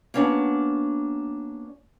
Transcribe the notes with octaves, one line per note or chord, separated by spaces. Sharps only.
A#3 B3 C#4 D4 F#4